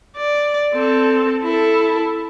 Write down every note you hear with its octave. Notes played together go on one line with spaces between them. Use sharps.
D5
C4 A4
E4 A4